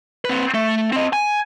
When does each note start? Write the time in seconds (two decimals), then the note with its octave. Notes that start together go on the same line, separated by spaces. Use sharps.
0.25 C4 B4
0.54 A3
0.93 C4 D#5
1.13 G#5